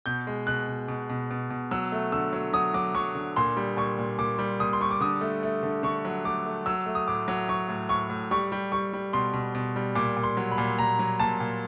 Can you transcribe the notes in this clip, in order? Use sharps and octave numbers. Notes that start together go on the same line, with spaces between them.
B2 G6
G#3
B2 F#6
B2
B2
B2
B2
B2
F#3 E6
A3
D3 E6
F#3
F#3 D#6
F#3 D6
F#3 C#6
D3
A#2 C6
G3
A#2 C#6
A#2
A#2 D6
G3
A#2 D#6
C6
G3 C#6
D6
D3 D#6
A3
A3
D3
D3 C#6
F#3
A3 D6
A3
F#3 E6
A3
D#6
A2 D6
F#3
F#3 C#6
A2
A2 C#6
A2
G3 C#6
G3
G3 C#6
G3
B2 C6
B2
B2
G3
A#2 D6
A#2
C6
F#3
B5
A#2
A#2 A#5
F#3
A#2 A5
A#2